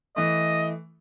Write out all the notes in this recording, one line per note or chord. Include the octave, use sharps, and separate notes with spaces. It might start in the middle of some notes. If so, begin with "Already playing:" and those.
E3 A3 D#5